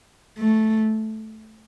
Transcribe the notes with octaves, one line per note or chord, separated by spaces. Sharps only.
A3